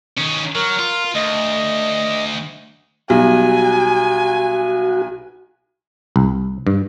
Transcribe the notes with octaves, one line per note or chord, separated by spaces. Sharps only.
D#3 C#4
F#3 A#4
F4
D2 D#5
B1 G3 F#4 G#5
C2
G2